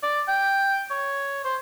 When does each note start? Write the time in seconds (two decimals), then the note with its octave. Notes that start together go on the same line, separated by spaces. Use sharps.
0.03 D5
0.28 G5
0.90 C#5
1.44 C5